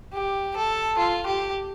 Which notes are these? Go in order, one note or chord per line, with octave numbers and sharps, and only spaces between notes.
G4
A4
F4
G4